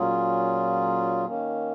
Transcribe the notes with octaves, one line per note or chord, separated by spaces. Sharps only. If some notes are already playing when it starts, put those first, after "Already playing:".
Already playing: A#2 F#3 C#4 F4 G#4
D#3 A#3 C#4